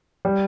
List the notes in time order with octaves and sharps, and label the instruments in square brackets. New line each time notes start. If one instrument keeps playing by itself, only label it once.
[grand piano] G3